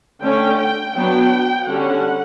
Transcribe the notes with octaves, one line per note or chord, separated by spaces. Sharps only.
D3 A3 C#4 G5
G5
F#3 B3 D4 G5
D3 G3 C#4 F#5